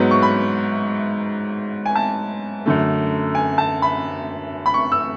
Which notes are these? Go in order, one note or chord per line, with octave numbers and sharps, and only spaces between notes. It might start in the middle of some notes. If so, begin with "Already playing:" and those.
Already playing: G#2 F#3 B3
C#6
B5
G#5
A5
F#2 D3 A3
G#5
A5
B5
B5
C#6
E6